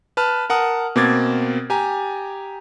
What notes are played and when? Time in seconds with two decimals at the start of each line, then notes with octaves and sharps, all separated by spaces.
0.17 B4 A5 F6
0.50 A#4 F#5 A5 D#6
0.96 B2 A#3 C4 D6 G#6 A6
1.70 G4 G#5 A#5